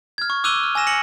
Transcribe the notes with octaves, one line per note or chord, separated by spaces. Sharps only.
F6 G#6
C#6
D6 E6 F#6 D#7 F7 G7
F6
G#5 E6 A#6 E7
A#6 C#7 F#7